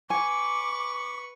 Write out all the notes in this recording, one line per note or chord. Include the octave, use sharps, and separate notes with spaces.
B4 G#5 C#6 D6